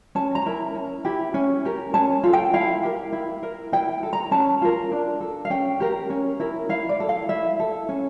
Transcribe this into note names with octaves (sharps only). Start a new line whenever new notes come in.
C#4 A5
A#5
E4 A#4
C#4
E4 G4
C#4
G4 A#4
C#4 A5
F4 A4
G5
E4 F5
G4 A#4
E4
A#4
E4 G5
A4
A#5
C#4 A5
F4 A#4
D4
A4
F5
C#4 G5
G4 A#4
C#4
E4 A#4
E4 F5
D5
A4
F5
E4 E5
A4
C#4